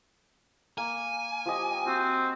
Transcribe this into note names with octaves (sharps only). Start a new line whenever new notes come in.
A#3 G#5
F3 G4 D#5
C4 F#4